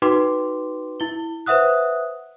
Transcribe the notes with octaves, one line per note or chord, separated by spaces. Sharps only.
D#4 F#4 B4 G5 C6 D6
E4 G7
B4 C5 E5 F#5 D#6 F#6